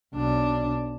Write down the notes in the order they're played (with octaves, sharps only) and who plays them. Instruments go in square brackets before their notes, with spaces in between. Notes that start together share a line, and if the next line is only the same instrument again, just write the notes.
[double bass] B1 D4